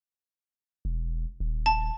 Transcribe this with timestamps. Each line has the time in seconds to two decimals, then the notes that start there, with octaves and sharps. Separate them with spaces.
0.85 E1
1.40 D#1
1.66 A5